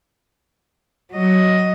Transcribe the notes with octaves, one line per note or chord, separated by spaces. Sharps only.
F#3 D#5